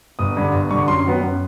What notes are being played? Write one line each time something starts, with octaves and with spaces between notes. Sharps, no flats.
G1 D#6
G2 D3
G1
G2 D3 C#6
F#2 C6
D#3 F#3 B3
F#2